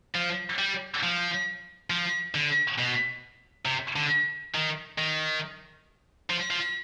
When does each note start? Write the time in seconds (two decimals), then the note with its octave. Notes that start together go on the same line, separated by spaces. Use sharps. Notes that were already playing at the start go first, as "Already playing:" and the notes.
0.15 F3
0.59 G3
1.03 F3
1.90 F3
2.35 D3
2.78 B2
3.65 C3
3.96 D3
4.54 D#3
4.98 D#3
6.30 F3
6.50 F3